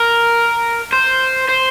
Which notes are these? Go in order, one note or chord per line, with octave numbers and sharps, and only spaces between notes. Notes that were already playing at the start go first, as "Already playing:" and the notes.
Already playing: A#4
C5
C5